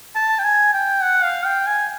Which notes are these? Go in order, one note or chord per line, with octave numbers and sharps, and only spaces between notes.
A5
G5
G#5
G5
F#5
F5
G5
G#5